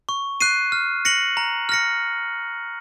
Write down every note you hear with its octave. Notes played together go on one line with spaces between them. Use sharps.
C#6
F#6 C7 D#7
F6
A#6 C#7 F#7
A#5
F6 A#6 C#7